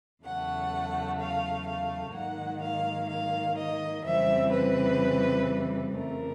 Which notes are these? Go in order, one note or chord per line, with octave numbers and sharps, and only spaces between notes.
E2 C#3 F#3 A3 F#5
F5
F5
G#2 D#3 F#3 A#3 F#5
F5
F5
D#5
F2 C#3 E3 G3 C4 E5
B4
F2 C#3 E3 A3 A#4